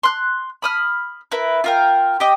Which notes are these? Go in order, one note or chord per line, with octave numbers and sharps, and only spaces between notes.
C6 F#6
B5 D#6 F6
E4 A#4 B4
F4 A#4 G5
G4 D#5